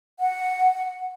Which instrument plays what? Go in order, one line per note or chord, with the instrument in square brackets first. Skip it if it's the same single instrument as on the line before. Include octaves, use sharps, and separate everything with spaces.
[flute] F#5